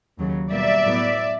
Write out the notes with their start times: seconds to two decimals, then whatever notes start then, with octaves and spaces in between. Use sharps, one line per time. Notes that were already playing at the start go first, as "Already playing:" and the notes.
0.18 D#2 C#3 F#3
0.51 B2 G3 A#3 D5 E5
0.85 A2 F#3 B3